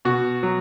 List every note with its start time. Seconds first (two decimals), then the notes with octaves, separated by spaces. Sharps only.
0.05 B2 F#4
0.43 F#3